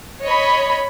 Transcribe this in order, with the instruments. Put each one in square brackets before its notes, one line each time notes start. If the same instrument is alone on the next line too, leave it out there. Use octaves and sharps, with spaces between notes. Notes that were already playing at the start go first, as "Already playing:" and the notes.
[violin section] C#5 D#5 B5